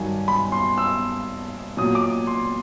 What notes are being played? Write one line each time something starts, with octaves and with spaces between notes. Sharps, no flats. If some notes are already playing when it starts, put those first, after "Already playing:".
Already playing: G2 D#3 F#3 G#5
B5
C6
E6
A#2 F#3 D#6
D6
C6